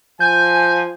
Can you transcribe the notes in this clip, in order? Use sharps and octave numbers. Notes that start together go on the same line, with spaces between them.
F3 G#5 G6